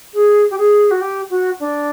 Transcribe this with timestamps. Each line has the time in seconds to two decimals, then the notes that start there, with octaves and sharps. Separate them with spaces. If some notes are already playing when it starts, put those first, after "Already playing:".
0.14 G#4
0.50 G4
0.58 G#4
0.91 F#4
1.01 G4
1.30 F#4
1.60 D4